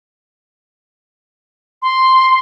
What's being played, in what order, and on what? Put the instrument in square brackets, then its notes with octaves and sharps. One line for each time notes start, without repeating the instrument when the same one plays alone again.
[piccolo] C6